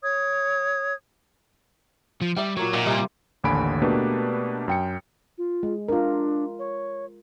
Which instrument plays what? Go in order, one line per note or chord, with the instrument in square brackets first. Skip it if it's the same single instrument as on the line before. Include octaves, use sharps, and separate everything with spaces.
[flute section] C#5 D#6 G#6
[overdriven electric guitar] F3
[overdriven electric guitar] G3 [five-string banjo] D5 E5 G5
[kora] A#2 A#4 C#5 [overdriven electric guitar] F#3
[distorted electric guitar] A#2 [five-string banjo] D#4 F#4 [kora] E5
[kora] C3 F4 [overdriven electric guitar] G3 [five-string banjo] D#5 G#5 A#5
[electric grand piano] A1 D#2 D3 G#5 B5 D7
B2 A3 A#3 D4 G4 B4
F#2 G5 C#7
[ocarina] F4
[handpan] G#3
[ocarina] D4 [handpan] F4 A#4
[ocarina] C#5